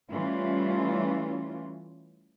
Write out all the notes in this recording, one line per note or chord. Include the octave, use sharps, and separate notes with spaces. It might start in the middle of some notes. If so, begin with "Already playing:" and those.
E3 G3 A3 C#4 F4